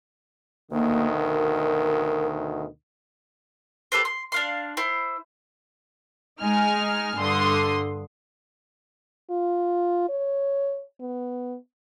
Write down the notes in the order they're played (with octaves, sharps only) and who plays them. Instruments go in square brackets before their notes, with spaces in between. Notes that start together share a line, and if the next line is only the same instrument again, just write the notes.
[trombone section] D2 B2 D#3 [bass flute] A#3
[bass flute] A#4
[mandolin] G4 A4 B4 C5
C6
D4 F5 C6
E4 C5
[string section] G#3 D#4 G#5 F6
G2 D3 C6 D#6
[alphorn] F4
C#5
B3